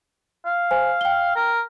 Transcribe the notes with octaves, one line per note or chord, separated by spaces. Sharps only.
F5
C5 G#5
G5 G7
A#4